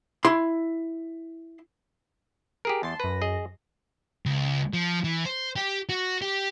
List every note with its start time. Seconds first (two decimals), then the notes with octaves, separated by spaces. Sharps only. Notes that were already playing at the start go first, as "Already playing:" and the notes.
0.25 E4 C6
2.65 G4 G#4 A#4
2.83 E2 A5 C6
3.00 F#2 B4 A#6
3.22 G#4 D#5
4.26 C#2
4.73 F3
5.04 E3
5.25 C5
5.56 G4
5.89 F#4
6.21 G4